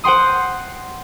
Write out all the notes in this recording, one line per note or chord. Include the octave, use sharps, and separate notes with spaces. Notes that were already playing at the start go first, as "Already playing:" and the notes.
C5 F#5 G5 C6 D#6